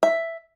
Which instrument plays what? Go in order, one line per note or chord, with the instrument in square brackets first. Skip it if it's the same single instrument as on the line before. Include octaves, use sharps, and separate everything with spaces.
[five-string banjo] E5